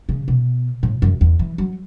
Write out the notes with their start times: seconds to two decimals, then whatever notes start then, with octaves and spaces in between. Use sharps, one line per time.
0.09 C#3
0.28 B2
0.83 A2
1.02 F#2
1.21 E2
1.39 E3
1.58 F#3